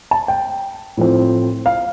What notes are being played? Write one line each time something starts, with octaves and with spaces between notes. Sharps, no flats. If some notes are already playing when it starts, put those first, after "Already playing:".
A5
G5
A2 F3 A3 C4
F5